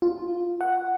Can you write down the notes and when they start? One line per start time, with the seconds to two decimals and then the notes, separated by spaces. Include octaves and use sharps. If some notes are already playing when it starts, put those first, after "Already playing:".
0.02 F4
0.61 F#5